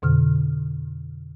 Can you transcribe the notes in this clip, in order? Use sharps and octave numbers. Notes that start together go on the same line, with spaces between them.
F2 B2 D3 F6